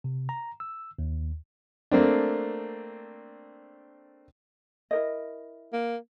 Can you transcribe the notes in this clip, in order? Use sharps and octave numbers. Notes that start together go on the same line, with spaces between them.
C3
A#5
E6
D#2
A3 A#3 C4 D4
E4 A#4 D#5
A#3